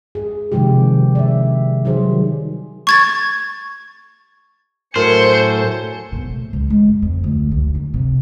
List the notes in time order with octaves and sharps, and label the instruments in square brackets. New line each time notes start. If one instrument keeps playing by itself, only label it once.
[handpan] G#4
C3 D#3 F3 G#3 G4
D5 E5
D#3 F#3 G3 G#4 C5
[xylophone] C#6 G#6 A6
[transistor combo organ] A2 F#3 A4 [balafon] A#4 [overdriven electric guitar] C5 [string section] G#5 C#7
[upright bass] B2
A2
C#2
G#3
F#2
F2
D2
D2
D3
C3